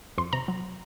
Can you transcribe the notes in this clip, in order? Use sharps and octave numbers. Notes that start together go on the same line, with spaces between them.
F2 C6
C3 A#5
F#3